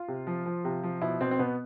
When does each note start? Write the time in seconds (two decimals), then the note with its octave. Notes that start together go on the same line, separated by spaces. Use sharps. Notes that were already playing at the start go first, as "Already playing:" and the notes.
Already playing: F4
0.08 C3
0.27 F3
0.46 F3
0.65 C3
0.83 F3
1.01 B2 E4
1.21 B2 C4
1.31 C4
1.39 B2 B3